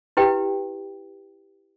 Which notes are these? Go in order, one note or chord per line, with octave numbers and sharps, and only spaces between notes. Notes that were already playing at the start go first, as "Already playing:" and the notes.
E4 G4 B4 G5